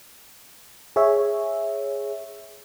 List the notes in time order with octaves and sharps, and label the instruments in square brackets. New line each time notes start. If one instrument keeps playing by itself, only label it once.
[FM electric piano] G#4 C#5 E5